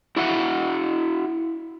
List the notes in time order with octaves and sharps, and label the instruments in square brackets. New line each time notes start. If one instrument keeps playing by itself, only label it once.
[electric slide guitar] E4 F#4 E5 F#5